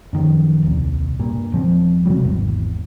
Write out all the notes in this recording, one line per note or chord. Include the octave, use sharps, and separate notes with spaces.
F#2 D#3 F3
D#1 C2
G2 A#2
E1 F3 C4
C3 D#3 F#3 G3
G#1 E2